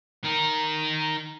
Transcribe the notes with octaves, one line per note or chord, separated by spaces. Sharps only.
D#4 A#4